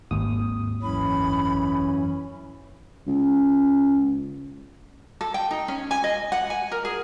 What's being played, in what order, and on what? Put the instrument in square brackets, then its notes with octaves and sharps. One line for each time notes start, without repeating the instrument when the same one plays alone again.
[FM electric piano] G#1 D#2 D#6
[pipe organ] F#2 E3 C#4 [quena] B5
[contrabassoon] C#2
[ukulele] A4
G5
D#4
C#4
G#5
D#5
F#5
G#5
A#4
G#4